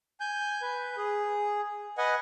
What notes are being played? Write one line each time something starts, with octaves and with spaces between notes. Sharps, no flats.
G#5 G6
B4
G#4
B4 D#5 F#5 G#5